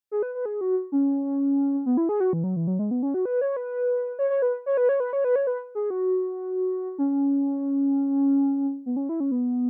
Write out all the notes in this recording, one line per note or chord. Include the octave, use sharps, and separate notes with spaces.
G#4
B4
B4
G#4
F#4
C#4
B3
E4
G#4
F#4
E3
F#3
E3
F#3
G#3
B3
C#4
F#4
B4
C#5
B4
C#5
C#5
B4
C#5
B4
C#5
B4
C#5
B4
C#5
B4
G#4
F#4
C#4
B3
C#4
E4
C#4
B3